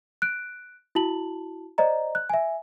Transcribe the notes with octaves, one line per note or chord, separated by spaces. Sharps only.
F#6 D7
E4 F#4 A5 F#7
C5 D5 D#5 A#5
F#6
E5 G#5